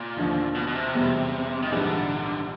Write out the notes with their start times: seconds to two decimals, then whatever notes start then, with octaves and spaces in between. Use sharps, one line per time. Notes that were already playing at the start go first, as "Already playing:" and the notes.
Already playing: A#2
0.17 D#2 D3 F3
0.55 B2
0.67 B2
0.75 C3
0.95 E2 B2 G3
1.63 D#3
1.71 A#1 G#2 D3 E3 G3